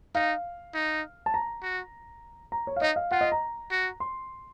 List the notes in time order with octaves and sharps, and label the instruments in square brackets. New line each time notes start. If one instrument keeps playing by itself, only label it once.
[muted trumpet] D#4 [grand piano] F5
[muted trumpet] D#4
[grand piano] A5
A#5
[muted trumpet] F#4
[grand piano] A#5
C#5
F5
[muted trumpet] D#4 [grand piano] D#5
[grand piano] F5
[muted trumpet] F4 [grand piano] F#5
[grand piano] D#5
A#5
[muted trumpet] F#4
[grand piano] C6